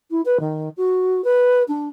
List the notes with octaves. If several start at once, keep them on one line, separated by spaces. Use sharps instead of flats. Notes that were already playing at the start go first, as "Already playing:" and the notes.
E4
B4
D#3
F#4
B4
D4